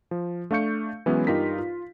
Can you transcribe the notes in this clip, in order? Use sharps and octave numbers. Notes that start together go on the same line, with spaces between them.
F3
A3 D4 F5 C#6 G6 C#7
E3 F#3 G#3 B3 C#4 E4
G2 D#4 F4 G4 A#4 B6
F4